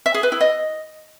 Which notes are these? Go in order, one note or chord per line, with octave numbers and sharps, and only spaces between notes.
E5
G#4
B4
E4
D#5